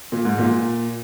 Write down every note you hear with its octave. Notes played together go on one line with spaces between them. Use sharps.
A#2
G#2
A#2